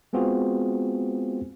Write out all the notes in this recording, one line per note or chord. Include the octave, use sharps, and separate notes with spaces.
G#3 B3 C4 F4 F#4 G#4